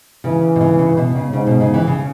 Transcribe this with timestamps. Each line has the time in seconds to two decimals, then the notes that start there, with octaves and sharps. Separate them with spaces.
0.24 C#3 E3
0.56 B2
0.61 C#3
0.79 C#3
0.97 B2
1.15 C#3
1.33 G#2 C#3
1.47 B2
1.61 C#3
1.74 E3
1.87 C#3